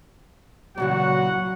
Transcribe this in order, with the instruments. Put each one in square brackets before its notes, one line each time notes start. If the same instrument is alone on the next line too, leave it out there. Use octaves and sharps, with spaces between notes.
[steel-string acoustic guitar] A#2 C#3 E3 [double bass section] F#3 [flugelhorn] F#4 [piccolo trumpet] F#5